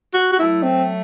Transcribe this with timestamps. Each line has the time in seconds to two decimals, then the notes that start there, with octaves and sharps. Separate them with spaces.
0.14 F#4
0.32 F#4
0.39 F#3 A3 E4
0.63 C4